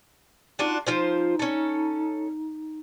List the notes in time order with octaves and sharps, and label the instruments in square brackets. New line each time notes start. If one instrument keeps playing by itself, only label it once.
[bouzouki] D4 F4 F#4 [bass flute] D#4
[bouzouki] F3 F4 C5 [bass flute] D#4
[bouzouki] C#4 A4